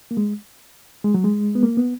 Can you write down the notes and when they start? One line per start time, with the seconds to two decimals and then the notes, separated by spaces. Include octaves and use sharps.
0.11 A#3
0.17 G#3
1.04 G#3
1.14 F#3
1.24 G#3
1.55 B3
1.63 A#3
1.77 B3